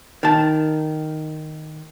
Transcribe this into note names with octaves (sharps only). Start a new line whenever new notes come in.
D#3 A5